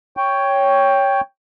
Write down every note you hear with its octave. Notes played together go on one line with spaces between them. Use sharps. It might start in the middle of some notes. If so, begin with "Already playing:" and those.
C#5 G5